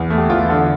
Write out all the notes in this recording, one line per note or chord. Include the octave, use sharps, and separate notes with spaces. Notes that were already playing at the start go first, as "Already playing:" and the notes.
Already playing: E2
A3
G4
E2 F4
D3